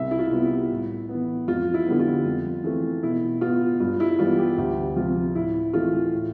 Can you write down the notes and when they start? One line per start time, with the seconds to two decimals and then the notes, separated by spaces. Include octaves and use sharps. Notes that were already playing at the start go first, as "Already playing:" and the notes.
Already playing: C2 E5
0.11 E4
0.19 F4
0.32 C3 G3 B3
0.45 E4
0.71 A2
1.09 B3
1.14 E3
1.48 F2 F4
1.74 E4
1.87 D3 G3 B3
1.99 F4
2.25 F2
2.64 E3 A3 C4
3.03 B2 E4
3.41 B3 F4
3.80 G2 F4
4.00 E4
4.19 E3 G3 B3 F4
4.38 G4
4.58 D2 G4
4.96 C3 F3 F4
5.35 A2 E4
5.73 E3 A3 C4 F4
6.13 A2